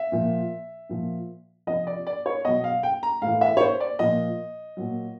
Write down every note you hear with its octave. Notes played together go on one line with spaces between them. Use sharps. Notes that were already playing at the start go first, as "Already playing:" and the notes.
Already playing: E5
A#2 F3
A#2 F3
C3 F3 D#5
D5
D5
C#5
B2 F#3 D#5
F5
G5
A#5
A2 F5
E3
E5
C#5
C5
D5
A#2 F3 D#5
A#2 F#3